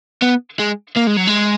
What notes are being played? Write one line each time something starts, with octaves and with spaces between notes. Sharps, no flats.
B3
G#3
A#3
G#3
F#3
G#3